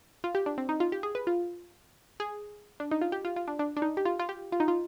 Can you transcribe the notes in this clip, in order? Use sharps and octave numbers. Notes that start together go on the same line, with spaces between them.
F4
G4
D4
C4
D#4
F4
G4
G#4
B4
F4
G#4
D4
D#4
F4
G4
F4
F4
D4
D4
D4
D#4
G4
F4
F4
G4
F4
D#4
F4